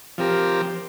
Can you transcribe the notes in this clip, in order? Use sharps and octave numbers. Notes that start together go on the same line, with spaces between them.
F3 C4 G4 A#4